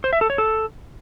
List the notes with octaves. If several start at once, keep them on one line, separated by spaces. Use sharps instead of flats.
C5
E5
A4
C#5
A4